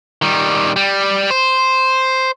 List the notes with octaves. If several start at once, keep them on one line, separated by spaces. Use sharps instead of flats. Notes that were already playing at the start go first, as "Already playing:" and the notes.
D#3 G3
G3
C5